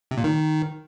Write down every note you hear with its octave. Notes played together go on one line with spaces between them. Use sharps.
C3
A#2
D#3